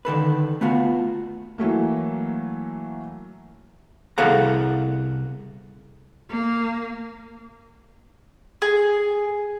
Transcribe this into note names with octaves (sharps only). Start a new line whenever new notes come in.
D3 D#3 A4 B4
A3 B3 F4 F#4
E3 F#3 A3 A#3
C2 G#4 A4 F5 F#5 A#5
A#3
G#4